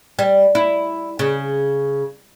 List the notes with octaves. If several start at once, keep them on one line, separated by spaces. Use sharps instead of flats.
G3
E4
C#3